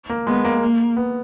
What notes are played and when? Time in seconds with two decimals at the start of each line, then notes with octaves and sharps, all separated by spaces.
0.10 A#3
0.27 G#3 B3
0.44 A#3
0.62 A#3
0.97 B3